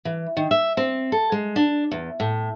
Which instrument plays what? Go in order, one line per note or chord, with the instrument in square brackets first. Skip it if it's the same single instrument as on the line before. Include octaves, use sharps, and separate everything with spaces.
[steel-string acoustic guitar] E3
D#3
E5
C4
A4
G#3
D4
E2
A2